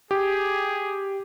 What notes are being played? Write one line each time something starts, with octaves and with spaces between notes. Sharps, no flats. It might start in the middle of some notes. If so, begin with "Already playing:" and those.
G4 G#4